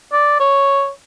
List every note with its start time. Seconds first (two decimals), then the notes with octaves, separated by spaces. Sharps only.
0.13 D5
0.40 C#5